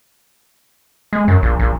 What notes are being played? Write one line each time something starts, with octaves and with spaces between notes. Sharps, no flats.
G#3
F#2
A#1
A#1